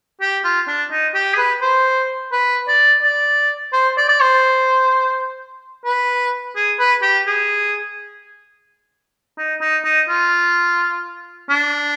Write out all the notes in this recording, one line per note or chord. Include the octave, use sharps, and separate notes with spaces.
G4
F4
D4
D#4
G4
G#4
B4
C5
B4
D5
D5
C5
D5
D5
C5
B4
G#4
B4
G4
G#4
D#4
D#4
D#4
F4
D4